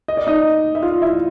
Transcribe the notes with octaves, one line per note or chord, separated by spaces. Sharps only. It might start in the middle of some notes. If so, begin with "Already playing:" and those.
D#5
D5
D#4 D#5
E5
F4 F5
E4 E5